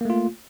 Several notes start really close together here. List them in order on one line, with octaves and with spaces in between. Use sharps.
A#3 A3 F4